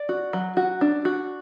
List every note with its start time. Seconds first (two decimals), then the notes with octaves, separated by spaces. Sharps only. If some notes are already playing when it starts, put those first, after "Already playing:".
Already playing: D5
0.09 F#4
0.33 F#3
0.57 F#4
0.81 D4
1.05 F#4